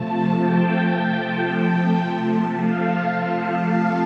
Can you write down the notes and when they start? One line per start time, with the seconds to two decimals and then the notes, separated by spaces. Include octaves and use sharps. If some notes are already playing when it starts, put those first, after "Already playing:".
Already playing: C3 F3 A3 A5
0.35 G5
1.99 C3 F3 A3 A5
2.54 F5
3.09 F5
3.64 F5